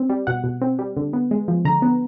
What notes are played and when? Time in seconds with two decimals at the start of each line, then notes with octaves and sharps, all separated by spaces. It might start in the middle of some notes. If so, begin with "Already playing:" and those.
Already playing: C4
0.10 G3
0.27 B2 F#5
0.44 B2
0.62 C4
0.79 G3
0.97 D3
1.13 B3
1.31 G#3
1.48 F3
1.65 D3 A#5
1.82 B3